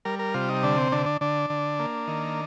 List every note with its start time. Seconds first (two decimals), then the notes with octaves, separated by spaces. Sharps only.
0.05 G3 A#4
0.19 A#4
0.34 C3 F4
0.49 D#4
0.63 D3 D4
0.78 C4
0.92 D3 D4
1.06 D4
1.21 D3 D4
1.50 D3
1.79 A#3
2.08 D#3